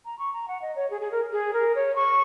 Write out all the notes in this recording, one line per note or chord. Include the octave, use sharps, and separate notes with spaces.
A#5
C#6
A#5
F#5
D#5
C#5
G#4
G#4
A#4
G#4
A#4
C#5
C#6